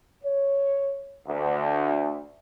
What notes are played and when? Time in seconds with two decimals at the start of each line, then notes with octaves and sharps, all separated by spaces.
0.24 C#5
1.28 D2